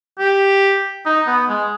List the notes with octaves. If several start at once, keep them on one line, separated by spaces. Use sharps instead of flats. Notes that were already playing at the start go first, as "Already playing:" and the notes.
G4
D#4
B3
G#3